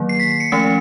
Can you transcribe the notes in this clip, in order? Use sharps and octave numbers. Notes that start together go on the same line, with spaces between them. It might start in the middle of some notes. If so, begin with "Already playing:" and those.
Already playing: D#3 F#3 A#3
C7
B6
C7
C#7
F3 A3 C#4 C#7